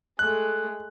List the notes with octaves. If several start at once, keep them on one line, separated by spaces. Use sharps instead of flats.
G#3 A3 F#6